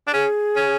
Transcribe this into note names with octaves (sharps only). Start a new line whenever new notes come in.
D4
C#4 G#4
C#4